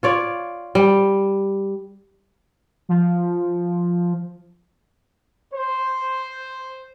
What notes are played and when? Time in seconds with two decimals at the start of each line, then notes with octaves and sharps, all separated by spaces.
0.03 F4 C#5 D5
0.75 G3
2.89 F3
5.53 C5